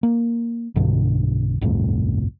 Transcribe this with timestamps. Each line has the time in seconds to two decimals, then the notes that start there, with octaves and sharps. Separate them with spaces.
0.03 A#3
0.76 B1 G2 B2 D3
1.61 G1 C2 F2 A2